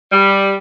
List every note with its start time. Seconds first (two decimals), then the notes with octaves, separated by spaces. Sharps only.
0.11 G3